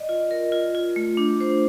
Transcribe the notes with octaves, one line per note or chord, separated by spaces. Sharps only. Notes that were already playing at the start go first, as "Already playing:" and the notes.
Already playing: D5 D#5
F4
A#4
F4
F4
A3
D4
C5